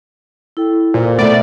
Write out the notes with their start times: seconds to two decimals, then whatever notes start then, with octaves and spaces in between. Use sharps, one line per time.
0.57 E4 A4 G5
0.94 A#2 C5
1.19 B2 A3 B3 D5